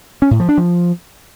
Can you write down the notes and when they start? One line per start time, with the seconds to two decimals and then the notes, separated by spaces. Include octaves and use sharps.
0.22 C#4
0.31 A2
0.40 F3
0.49 D4
0.58 F3